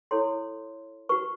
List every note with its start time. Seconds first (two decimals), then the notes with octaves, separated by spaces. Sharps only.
0.11 E4 A4 C#5 C6
1.09 F#4 B4 C#6